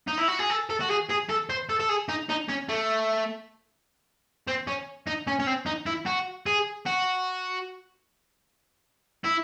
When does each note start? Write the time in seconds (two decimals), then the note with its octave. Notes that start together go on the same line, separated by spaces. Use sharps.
0.08 D#4
0.18 E4
0.28 F#4
0.39 G#4
0.50 A4
0.70 A4
0.80 F#4
0.90 G#4
1.09 G#4
1.29 A4
1.50 C5
1.69 A4
1.80 A4
1.89 G#4
2.09 D#4
2.29 D#4
2.49 C#4
2.69 A3
4.47 C4
4.67 C#4
5.07 D#4
5.27 C#4
5.39 C#4
5.47 C4
5.66 D#4
5.86 E4
6.06 F#4
6.46 G#4
6.86 F#4
9.24 E4